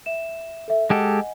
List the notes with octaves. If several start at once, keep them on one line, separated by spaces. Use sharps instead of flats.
E5 E7
A4 E5
G#3 G4 A4 D#5 F#5 G#5